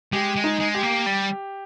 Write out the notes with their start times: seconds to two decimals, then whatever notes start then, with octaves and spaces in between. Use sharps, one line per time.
0.12 G#3 G4
0.36 G#3
0.44 D#4
0.60 G#3
0.75 G4
0.83 A#3
1.06 G3